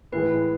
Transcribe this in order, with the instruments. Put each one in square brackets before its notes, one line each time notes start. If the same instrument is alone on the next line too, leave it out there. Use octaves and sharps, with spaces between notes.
[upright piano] A2 E3 G#3 [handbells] B4